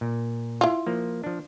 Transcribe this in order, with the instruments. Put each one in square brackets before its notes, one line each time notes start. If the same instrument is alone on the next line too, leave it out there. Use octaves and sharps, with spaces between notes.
[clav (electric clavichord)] A#2
[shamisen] E4 F4
[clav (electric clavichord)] F3 A#3
F3 D4